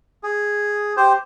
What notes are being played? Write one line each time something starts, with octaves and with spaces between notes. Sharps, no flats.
G#4
G4 C5